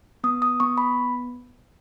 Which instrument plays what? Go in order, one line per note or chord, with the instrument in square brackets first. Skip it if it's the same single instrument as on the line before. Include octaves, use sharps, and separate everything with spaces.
[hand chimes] B3 D#6
D#6
B3 C#6
B5